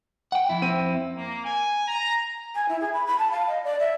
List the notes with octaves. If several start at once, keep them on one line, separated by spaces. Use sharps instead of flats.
F#5 G5
F2 E4
C4 D#7
A#3
G#5
A#5
G#5
E4
G#4
B5
B5
A5
F5
D#5
D5
E5